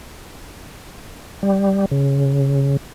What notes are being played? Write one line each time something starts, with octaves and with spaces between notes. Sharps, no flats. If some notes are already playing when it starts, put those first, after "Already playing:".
G3
C#3